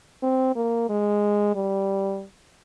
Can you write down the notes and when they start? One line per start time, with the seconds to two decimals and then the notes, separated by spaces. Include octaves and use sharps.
0.22 C4
0.56 A#3
0.89 G#3
1.55 G3